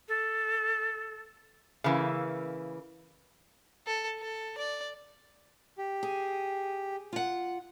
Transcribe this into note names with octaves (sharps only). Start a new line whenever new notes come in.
A4
C#3 E3 A#3
A4
A4
D5
G4
G#4
F4 F#5